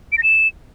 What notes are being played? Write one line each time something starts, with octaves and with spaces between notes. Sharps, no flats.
D7
A#6
E7